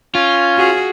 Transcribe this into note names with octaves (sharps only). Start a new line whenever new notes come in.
C#4 F4
F#4 G#4